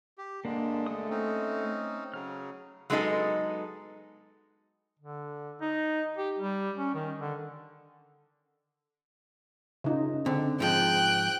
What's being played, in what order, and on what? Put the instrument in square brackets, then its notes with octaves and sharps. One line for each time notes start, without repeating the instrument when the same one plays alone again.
[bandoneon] G4
[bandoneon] G2 D3 G#3 [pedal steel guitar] A#3 D4
[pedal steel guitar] A3 D#6
[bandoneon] C4 C#4 D#4
[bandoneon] C#3 F#3 [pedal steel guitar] F6
[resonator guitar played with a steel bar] F#3 G#3 B3 D#4 A4 D#5
[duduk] D3
D#4
G4
G3
C#4
D#3
D3
[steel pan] C#3 D#4 F4
[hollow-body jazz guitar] D3 [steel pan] C4
[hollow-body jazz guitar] G#2 F3 [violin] G5 F#6